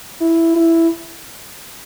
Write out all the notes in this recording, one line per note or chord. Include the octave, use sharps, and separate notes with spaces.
E4
E4